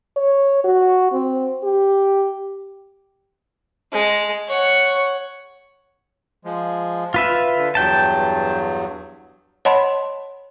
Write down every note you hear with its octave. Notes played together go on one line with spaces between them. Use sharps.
C#5
F#4
C4
G4
G#3
C#5 F#5
F3 G#3
F4 B4 E5 F6
D3
E2 G2 F#3 G5 A5
C#5 D#5 F#5 A5 B5 C6